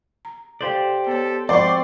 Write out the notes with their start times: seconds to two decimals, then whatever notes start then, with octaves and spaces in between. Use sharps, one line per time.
0.25 A#5
0.61 G4 A4 C5 D5 F5 G5
1.07 B3 A4 C#5
1.49 F3 G#3 C4 D5 F#5 C6 C#6